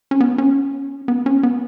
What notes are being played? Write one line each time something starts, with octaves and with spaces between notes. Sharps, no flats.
C#4
B3
C#4
B3
C#4
B3